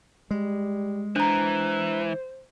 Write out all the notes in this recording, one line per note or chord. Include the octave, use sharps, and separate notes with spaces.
G3 G#3
E3 D4 C5 A#5